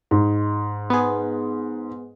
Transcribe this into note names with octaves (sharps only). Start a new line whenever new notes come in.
G#2
B3 G#4